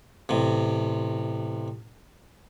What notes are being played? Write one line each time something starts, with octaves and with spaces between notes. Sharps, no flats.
A1 C3